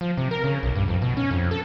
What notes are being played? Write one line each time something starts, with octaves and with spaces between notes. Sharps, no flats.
F3
C3
A#4
C#3
B1
G2
F2
B2
C#4
F2
A4